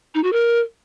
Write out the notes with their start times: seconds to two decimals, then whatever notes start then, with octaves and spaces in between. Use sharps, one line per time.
0.15 D#4
0.24 F#4
0.33 A#4